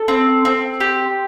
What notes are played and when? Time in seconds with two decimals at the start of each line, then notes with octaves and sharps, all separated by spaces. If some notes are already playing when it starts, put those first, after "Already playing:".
Already playing: A4
0.08 C4
0.45 C4
0.80 G4